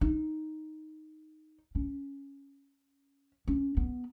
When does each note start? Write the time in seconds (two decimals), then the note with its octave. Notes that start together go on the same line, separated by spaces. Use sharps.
0.01 D#4
1.75 C#4
3.48 C#4
3.77 B3